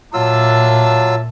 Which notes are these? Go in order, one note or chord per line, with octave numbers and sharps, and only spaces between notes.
A#2 F#3 D4 F4 E5 A5 E6